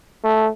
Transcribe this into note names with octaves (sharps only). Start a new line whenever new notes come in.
A3